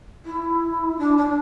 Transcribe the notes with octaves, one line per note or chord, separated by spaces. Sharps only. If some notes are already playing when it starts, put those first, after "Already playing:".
E4
D4
D4